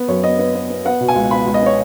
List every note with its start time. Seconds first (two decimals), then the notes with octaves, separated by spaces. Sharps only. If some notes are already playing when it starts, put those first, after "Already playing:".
Already playing: B3 B4
0.08 F#2 C#5
0.24 B3 D#5
0.39 B3
0.55 B3
0.70 B3
0.85 B3 F#5
1.01 B2
1.08 G#5
1.16 C#2
1.31 B3 B5
1.47 C#2
1.54 D#5
1.62 B3 C#5